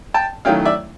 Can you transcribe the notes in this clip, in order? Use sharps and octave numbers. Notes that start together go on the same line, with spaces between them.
G5 A5
D#3 F#3 A3 C#4 E4 F5 G5
D5 E5